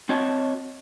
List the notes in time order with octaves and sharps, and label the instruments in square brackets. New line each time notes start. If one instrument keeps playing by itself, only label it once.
[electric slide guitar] C4 F#4 C#5 D#5 A5